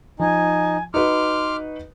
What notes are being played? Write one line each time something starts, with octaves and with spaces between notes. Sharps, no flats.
F3 D#4 G#5
D#4 F#4 B4 C6 D6 F6